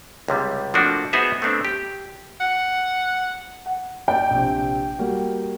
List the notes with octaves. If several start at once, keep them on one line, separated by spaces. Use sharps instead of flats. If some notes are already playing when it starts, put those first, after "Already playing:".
C#2 C3 G3
F3 A3 A#3 C4 D4 F#4
B3 D#4 F#4 G#4 C5 E5
A3 B3 C4 D4
G4
F#5
F#5
D5 G5 A5
A#1 C3
G3 A#3 F#4